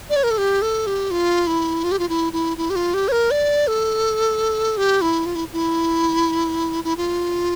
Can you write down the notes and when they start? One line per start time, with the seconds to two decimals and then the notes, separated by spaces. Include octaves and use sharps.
0.10 D5
0.16 C#5
0.23 A#4
0.31 A4
0.38 G4
0.62 A4
0.87 G4
1.11 F4
1.47 E4
1.84 F4
1.91 G4
1.99 F4
2.09 E4
2.33 E4
2.57 E4
2.70 G4
2.76 F4
2.94 G4
3.08 C#5
3.12 A#4
3.31 D5
3.67 A4
4.77 G4
5.01 E4
5.26 F4
5.35 E4
5.53 E4
6.84 E4
6.97 F4